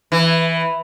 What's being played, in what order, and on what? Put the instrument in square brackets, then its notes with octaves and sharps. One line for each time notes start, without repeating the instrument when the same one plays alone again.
[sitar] E3